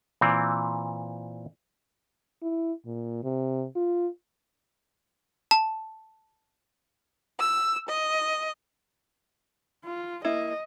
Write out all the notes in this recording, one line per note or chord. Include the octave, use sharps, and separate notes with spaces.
A#2 E3 C4
E4
A#2
C3
F4
A5
E6
D#5
F4
A#3 E4 D#5